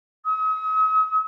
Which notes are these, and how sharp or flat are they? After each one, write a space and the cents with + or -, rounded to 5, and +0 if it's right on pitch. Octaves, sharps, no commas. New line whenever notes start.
D#6 +45